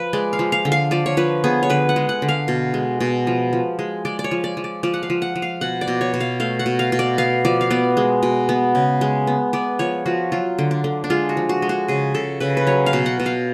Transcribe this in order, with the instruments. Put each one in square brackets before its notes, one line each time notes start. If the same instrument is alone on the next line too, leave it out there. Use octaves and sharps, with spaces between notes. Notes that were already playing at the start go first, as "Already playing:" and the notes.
Already playing: [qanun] F3 B4
G#3 D5
F5
F3
F5
D3
F5
F3 D5
C#5
F3 B4
B3 G#4
C#5
D3 B4
F#5
G#3
F#5
D3
F5
B2
G#3
B2
F3
F3
G#3
G#3 D5
D5
C#5
F3
D5
F3
D5
F3 D5
F#5
F5
F3
F#5
F3
F5
B2 F#5
D5
B2
C#5
B2
F5
A3 F5
F#5
B2
F5
B2
D5
B3 F5
F3 D5
F5
B3 D5
G#3
B2
B3
C#3
G#3
B3
B3 D5
F3 C#5
F3 F#4
F#3 F4
D3
D4
D3
D4
G#3 F4
F#4
F3
F#4
G#3
F#4
C#3 G#4
C#3 A4
C#3 B4
B4
F#3 C#5
F5
B2
F#5
B2
F5